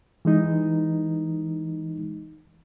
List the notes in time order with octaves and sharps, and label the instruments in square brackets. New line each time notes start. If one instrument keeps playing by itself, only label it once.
[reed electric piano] E3 G#3 D#4